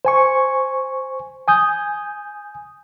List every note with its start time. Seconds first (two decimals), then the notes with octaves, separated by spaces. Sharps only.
0.05 C5 G#5 C#6
1.48 G#5 D#6 G6